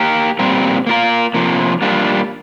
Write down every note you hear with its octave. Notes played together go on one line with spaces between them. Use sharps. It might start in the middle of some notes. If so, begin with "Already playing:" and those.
Already playing: A#3 G4 A#4
A#2 G3 C4 A#4
A#3 F4 A#4
C3 F3 A#3
G3 A#3 D4 F4